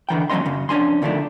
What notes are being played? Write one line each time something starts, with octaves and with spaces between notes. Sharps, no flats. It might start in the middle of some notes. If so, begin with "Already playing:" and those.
D3 E3 G5
D#2 F#3 C4 C#4 D#5 C6
F#2 C#3
F2 C#4 D4 G#5 C6
D3 D#3 F3 A3 D4